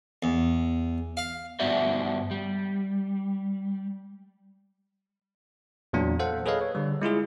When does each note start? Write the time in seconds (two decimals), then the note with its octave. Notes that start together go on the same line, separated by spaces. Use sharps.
0.23 E2
1.17 F5
1.60 G2 B3 F#4 C5 D5 E5
2.31 G3
5.93 E2 A#2 F#3 A#3 D4
6.19 A4 C5 F5 F#5
6.46 G#4 A4 B4 C#5 D#5 F5
6.61 C#5
6.75 D3 G3
7.01 G#3 E4 F4 G#4